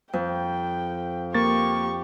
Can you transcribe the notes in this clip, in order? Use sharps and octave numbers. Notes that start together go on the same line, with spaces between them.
F2 G5
A#3 G4 C#6 A6